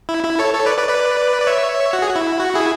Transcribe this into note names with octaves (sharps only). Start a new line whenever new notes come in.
E4
E4
A4 C#5
A4 C#5
B4 D5
B4 D5
B4 D5
D5
C#5 E5
F#4
G#4
F#4
E4
F#4
E4 G#4